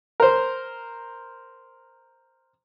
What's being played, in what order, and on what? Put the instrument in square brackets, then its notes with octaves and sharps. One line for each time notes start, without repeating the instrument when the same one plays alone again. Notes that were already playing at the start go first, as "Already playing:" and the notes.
[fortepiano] A#4 C5